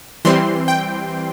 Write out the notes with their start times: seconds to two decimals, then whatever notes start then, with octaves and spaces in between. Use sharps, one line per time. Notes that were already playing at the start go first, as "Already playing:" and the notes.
0.25 E3 G3 C4 C6
0.68 G5